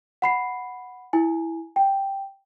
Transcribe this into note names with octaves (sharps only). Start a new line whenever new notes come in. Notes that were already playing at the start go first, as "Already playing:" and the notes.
F#5 B5 C7
E4 G#5
G5